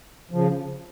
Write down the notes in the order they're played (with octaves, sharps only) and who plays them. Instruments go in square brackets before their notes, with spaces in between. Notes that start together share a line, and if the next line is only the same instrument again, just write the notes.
[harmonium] C#3 F3